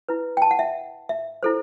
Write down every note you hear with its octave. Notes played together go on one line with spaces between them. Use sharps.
E4 B4
G5
A5
F#5
E5
E5
E4 A4 C5